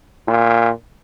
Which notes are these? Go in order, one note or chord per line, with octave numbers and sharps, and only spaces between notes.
A#2